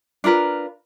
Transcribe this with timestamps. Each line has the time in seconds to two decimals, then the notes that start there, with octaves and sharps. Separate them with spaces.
0.24 D4 F4 A#4 B4